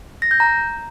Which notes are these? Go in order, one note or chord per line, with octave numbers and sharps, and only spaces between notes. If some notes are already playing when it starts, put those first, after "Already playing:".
A#6
G6
A#5